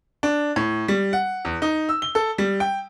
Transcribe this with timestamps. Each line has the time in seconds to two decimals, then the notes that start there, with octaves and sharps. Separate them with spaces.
0.23 D4
0.56 A2
0.88 G3
1.13 F#5
1.45 E2
1.62 D#4
1.89 E6
2.02 G7
2.15 A4
2.38 G3
2.60 G5